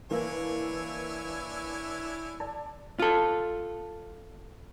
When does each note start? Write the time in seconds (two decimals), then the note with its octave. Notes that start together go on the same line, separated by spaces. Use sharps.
0.11 E3 A#3 D4 E4 C#5 G#5
2.40 D5 A5
2.99 F4 A4